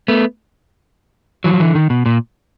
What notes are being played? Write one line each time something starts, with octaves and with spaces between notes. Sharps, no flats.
A3 B3
E3 F#3
F3
D3 E3
D#3
B2
A#2